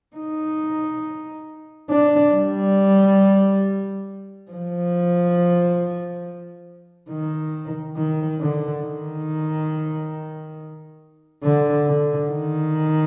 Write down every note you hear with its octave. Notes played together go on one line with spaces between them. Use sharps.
D#4
D4
G3
F3
D#3
D#3
D3
D#3
D3
D3
D#3